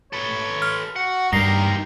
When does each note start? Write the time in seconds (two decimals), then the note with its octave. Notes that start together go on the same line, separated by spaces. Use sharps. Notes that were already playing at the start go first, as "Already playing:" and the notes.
0.13 A4 B4 C#5
0.62 F6
0.96 F#4 F#5
1.33 G2 D#4 G4 A#4 A#6 C7